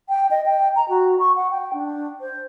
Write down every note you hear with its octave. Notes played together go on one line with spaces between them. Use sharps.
G5
D#5
G5
A#5
F#4
C#6
F#5
G5
D4
C5